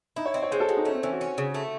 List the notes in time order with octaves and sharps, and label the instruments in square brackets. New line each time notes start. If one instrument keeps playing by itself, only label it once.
[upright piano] D#4 [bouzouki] E4
[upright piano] C#5
[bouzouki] C4 [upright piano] D#5
[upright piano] C#5
[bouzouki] G#3 [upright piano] C5
[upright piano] A4
[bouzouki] G#3 [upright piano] F#4
[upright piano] D#4
[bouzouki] A3 [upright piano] C#4
[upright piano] C4
[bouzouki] E3 [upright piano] C#4
[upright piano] F#4
[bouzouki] C#4
C#3
A3